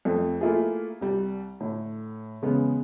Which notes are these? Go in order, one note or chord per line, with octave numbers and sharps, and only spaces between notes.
F2 A3
A3 A#3 E4 F4 G#4
C2 G3
A2 D3
E2 C#3 G#3 B3